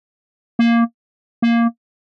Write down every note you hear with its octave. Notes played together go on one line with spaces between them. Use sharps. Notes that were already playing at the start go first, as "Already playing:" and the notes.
A#3
A#3